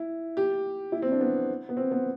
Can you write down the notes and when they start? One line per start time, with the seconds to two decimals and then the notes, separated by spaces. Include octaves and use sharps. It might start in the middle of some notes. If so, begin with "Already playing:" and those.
Already playing: E4
0.37 G4
0.92 E4
1.02 C4
1.12 D4
1.21 B3
1.69 B3
1.77 C4
1.92 B3